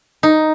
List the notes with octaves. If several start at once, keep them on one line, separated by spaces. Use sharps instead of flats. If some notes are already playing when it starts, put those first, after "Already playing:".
D#4